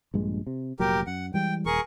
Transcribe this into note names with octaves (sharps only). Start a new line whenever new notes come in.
A#1 G2 G#3
C3
F1 A#2 F#3 G4 A#4
F#2 F#5
E3 G3 G#3 G5
D#1 G#4 A#4 C#6